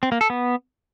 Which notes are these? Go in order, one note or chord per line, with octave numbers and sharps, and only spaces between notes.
C4
A#3
A4
B3